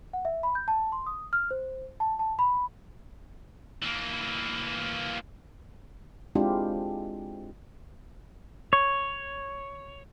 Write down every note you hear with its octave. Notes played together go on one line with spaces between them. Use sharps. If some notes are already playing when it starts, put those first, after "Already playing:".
F#5
E5
B5
G6
A5
C6
D#6
F6
C5
A5
A5
B5
E3 A#3
G#3 C4 D4 E4 F4 G4
C#5